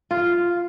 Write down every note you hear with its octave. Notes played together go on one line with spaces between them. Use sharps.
F4